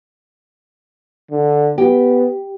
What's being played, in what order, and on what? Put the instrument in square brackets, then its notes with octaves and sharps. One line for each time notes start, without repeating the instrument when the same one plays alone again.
[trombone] D3
[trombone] B3 [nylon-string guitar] G4